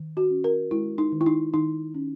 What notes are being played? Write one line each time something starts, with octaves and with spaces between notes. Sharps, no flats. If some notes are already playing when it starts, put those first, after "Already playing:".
Already playing: D#3
F#4
C#4
A#4
G#3 E4
D#4
D#3
E4
D#4
D#3 D#4
C#4